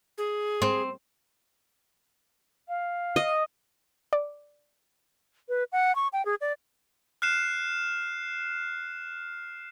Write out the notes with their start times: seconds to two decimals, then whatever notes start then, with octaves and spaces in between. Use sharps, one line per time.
0.18 G#4
0.62 C4
2.68 F5
3.16 D#5
4.13 D5
5.49 B4
5.72 F#5
5.96 C#6
6.13 G5
6.25 G#4
6.41 D5
7.22 F6 F#6 C7 E7